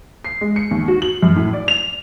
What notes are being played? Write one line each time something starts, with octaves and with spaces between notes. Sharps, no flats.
C7
G#3
C#7
D#2
F#4
F#7
F#2
A2
D5
F7